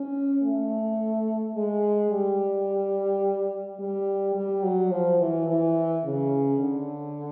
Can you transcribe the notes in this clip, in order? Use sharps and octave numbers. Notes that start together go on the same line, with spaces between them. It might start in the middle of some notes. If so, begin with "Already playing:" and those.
Already playing: C#4
A3
G#3
G3
G3
G3
F#3
F3
E3
E3
C#3
D3